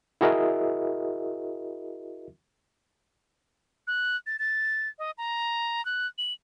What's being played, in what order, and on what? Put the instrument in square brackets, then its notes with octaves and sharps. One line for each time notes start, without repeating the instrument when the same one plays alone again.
[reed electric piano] E4 F#4 G#4 A#4 D#5 E5
[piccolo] F#6
A6
A6
D#5
A#5
F#6
F#7